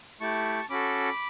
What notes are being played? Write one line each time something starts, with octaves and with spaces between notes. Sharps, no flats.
A3 E4 G4 A5 C#6
C#4 F#4 A4 B5 D6